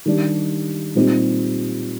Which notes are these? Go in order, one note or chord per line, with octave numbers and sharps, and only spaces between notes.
D#3 G3 D4 G4
A#2 G3 C4 D#4 G4